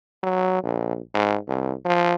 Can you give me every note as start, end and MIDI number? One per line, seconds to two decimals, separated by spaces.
0.23 0.63 54
0.63 0.97 34
1.14 1.37 44
1.48 1.73 36
1.85 2.15 53